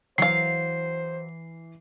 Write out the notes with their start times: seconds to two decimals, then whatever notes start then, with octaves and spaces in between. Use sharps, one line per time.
0.18 E3 F#3 C5 F5 C7